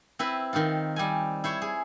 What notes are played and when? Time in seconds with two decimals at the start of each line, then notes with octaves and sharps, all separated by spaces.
0.19 C4 E4 B4 B5 C6
0.53 D#3 C4 D#4 F4
0.96 G3 C4 G#5
1.44 E4 C5 C#5
1.62 G#4